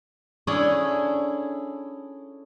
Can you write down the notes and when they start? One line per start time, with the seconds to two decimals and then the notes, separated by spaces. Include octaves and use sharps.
0.47 C#4 D4 E4 G#4 A4 C#5